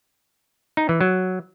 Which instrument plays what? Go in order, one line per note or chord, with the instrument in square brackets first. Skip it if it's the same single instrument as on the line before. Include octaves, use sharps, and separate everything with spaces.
[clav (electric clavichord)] D#4
E3
F#3